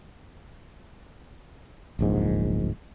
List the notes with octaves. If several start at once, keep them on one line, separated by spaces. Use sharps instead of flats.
D1 A#1 G#2